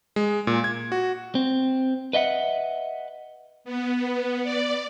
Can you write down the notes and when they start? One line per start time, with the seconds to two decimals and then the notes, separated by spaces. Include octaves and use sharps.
0.16 G#3
0.47 A#2
0.64 G#6
0.92 F#4
1.35 C4
2.13 B4 D#5 E5 F#5
3.64 B3
4.43 D5